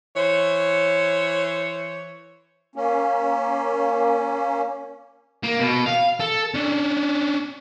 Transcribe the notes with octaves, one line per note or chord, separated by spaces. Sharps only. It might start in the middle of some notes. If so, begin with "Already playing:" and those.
E3 C5 C#5
A#3 C#4
A#3
B2
F5
A4
C#4 D4